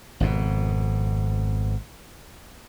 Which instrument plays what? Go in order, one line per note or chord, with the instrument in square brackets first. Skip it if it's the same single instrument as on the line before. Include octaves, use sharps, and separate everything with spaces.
[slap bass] G#1 F2 B2